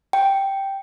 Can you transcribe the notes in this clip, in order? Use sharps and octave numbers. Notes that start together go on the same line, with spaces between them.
G5